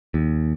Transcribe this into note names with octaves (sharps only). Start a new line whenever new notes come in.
D#2